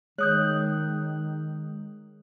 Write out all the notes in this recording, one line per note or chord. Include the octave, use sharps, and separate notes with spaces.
D#3 G#3 C#5 D#6 F#6 G6